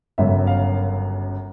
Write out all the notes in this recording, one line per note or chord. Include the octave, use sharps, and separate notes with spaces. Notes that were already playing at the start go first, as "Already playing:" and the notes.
G1 F#2 C#3 F#3 E5
F5